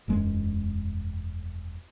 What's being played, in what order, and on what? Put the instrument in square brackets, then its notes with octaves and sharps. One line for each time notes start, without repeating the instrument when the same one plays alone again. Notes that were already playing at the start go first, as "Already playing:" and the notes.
[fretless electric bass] E1 F#2 G#3